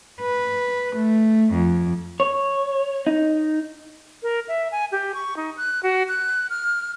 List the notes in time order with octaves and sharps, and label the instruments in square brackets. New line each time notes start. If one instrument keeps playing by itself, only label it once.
[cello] B4
A3
F2
[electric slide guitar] C#5
D#4
[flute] A#4
E5
G#5
G4
C#6
D#4
F#6
F#4
F#6
F6